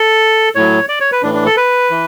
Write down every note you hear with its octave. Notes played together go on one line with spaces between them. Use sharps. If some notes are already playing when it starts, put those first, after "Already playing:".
Already playing: A4
A2 F#3 C#5
D5
C#5
B4
A2 E3 D4
D4
A4
B4
E3